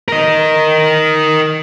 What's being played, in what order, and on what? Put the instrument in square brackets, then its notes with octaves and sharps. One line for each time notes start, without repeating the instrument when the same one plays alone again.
[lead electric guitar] A#4 D#5